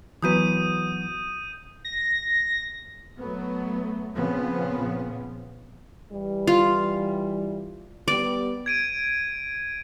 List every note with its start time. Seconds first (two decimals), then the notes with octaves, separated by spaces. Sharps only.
0.22 E3 F#3 B3 D#6 G6 D#7
1.85 A#6
3.19 F#3 A3 B3
4.15 A#2 C#3 F3 B3 C4
6.12 E3 G3
6.47 F4
8.08 G3 B3 D5
8.66 G#6 D7 D#7